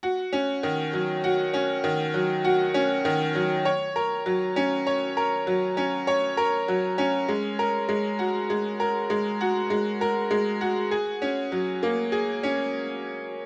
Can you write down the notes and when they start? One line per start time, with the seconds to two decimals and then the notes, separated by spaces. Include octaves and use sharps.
0.03 F#4
0.33 C#4
0.63 D#3
0.93 F#3
1.24 F#4
1.54 C#4
1.84 D#3
2.14 F#3
2.44 F#4
2.74 C#4
3.05 D#3
3.35 F#3
3.65 C#5
3.96 A#4
4.26 F#3
4.56 C#4
4.87 C#5
5.17 A#4
5.47 F#3
5.77 C#4
6.07 C#5
6.37 A#4
6.68 F#3
6.98 C#4
7.28 G#3
7.59 A#4
7.89 G#3
8.19 F#4
8.50 G#3
8.80 A#4
9.10 G#3
9.41 F#4
9.70 G#3
10.01 A#4
10.31 G#3
10.61 F#4
10.91 G#4
11.22 C#4
11.52 F#3
11.83 A#3
12.12 G#4
12.43 C#4